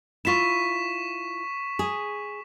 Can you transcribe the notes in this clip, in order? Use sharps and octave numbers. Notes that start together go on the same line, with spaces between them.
E4 F4 C#6 B6 E7
G#4